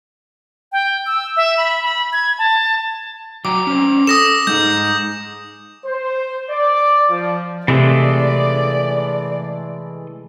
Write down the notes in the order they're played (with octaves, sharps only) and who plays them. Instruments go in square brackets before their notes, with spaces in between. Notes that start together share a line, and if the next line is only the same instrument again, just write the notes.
[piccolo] G5
E6
E5
B5
B5
G#6
A5
[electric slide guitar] F#3 G5 A#5 [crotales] D6
[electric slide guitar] C#4 C5
[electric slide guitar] A4 [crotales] D#6 A#6 E7
[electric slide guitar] G#3 D#4 G#4 [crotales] G6
[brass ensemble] C5
D5
F3
[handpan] C3 [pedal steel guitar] E3 G#3 A3 [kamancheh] D5